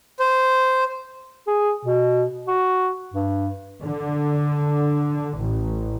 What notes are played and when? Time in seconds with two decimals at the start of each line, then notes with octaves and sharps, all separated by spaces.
0.20 C5
1.47 G#4
1.85 B2
2.47 F#4
3.14 G2
3.82 D3
5.38 A1